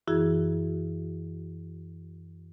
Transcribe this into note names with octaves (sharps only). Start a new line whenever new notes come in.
F#2 E3 E4 F#4 G#4